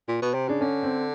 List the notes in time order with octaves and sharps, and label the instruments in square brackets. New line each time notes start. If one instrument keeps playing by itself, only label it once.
[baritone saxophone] A#2
B2
C3
[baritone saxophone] C#3 [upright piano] D4
[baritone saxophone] D3 [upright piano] C#4
[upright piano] C4